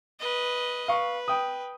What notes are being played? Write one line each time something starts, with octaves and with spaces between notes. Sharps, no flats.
B4 D#5
B4 F5 C#6
G5 D#6